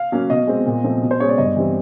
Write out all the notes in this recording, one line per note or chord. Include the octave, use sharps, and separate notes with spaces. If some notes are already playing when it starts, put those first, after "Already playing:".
Already playing: F5
F#3 A#3 C#4
B2 D#5
G#3 C4
A#2
F3 A3 C4
B2
C5
G#3 C#4 C#5
D5
G2 D#5
E3 G3 C4